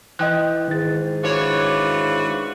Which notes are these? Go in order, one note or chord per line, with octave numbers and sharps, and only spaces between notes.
E3 D#5 G5 F#6
G#2 D#3 A6
E3 D4 F4 F#4 C#5